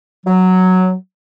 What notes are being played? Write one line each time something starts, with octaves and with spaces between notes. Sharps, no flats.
F#3